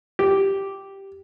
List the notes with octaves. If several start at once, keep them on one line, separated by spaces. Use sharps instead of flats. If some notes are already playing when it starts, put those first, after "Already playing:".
G4